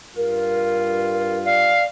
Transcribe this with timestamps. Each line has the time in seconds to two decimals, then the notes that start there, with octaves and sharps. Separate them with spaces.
0.16 G2 F4 A#4
1.45 D5 F5